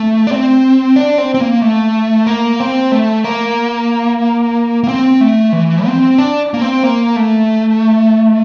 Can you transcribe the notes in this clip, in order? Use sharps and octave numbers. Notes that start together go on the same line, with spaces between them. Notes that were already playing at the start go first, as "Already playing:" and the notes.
Already playing: A3
D4
C4
D4
C4
C4
A#3
A3
A#3
C4
A3
A#3
A#3
C4
A3
E3
C4
D4
A#3
C4
A#3
A3